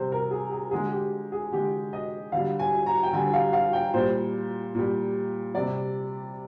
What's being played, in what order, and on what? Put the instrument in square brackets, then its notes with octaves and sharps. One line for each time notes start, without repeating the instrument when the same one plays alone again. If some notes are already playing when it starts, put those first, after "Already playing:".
Already playing: [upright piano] C3 G3 C5
A#4
G#4
G#4
D3 G#3 G#4
G4
G#4
D3 G#3 G4
D#5
D3 G3 F5
G#5
A#5
G5
D3 G3 G#5
F5
F5
G5
A#2 G3 C5
A#2 G3
C3 G3 D5